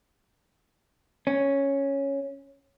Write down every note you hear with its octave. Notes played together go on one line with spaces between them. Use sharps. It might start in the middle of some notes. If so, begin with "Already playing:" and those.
C#4